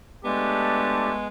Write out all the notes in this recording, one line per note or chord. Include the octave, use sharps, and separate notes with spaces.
G#3 A3 B3 D4 G4